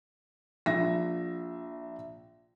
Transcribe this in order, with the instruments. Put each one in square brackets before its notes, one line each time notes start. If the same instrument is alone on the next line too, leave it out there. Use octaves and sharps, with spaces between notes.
[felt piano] A#1 E5 A#6